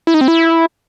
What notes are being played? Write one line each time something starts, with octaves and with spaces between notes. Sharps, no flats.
E4
D#4
C4
E4